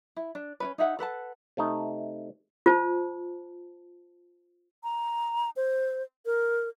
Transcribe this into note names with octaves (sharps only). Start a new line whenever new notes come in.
E4
D4
C#4 D4 B4
D#4 G#4 E5 F#5
A4 B4 F#5 A5
C3 A3 D#4
F4 C5 A5
A#5
C5
A#4